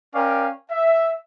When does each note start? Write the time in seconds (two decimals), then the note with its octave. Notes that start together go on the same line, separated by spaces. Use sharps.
0.14 C#4 A#4 D5 F5 G5
0.70 E5